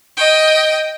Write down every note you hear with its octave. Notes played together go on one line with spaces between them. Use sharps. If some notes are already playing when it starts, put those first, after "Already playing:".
D#5 G5